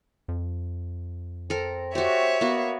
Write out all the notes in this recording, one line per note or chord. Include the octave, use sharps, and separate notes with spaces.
F2
C4 A4 A#4
C4 F#4 G4 C#5 E5
A#3 B3 F#4